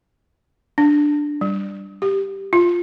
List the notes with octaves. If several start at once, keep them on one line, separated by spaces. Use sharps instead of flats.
D4
G3
G4
F4